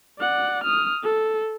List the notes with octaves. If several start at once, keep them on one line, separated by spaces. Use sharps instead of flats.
D5 F#5
D#6 F6
A4